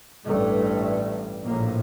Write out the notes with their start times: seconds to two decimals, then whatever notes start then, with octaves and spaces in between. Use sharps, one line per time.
0.25 A1 G2 A3
1.44 A#1 A2 A#3